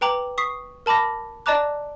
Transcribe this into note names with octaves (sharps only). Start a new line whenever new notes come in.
B4 G5 A#5 D6 F#7
C#6 D#6 B6 C7
A#4 A5 B5 D6 A#6
D5 D#5 A5 A#5 D6 F#6